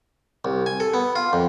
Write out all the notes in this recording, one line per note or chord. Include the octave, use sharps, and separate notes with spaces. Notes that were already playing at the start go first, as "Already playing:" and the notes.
C2
G#5
A4
B3
F4
F2